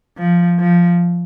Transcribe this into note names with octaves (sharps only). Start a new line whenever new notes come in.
F3
F3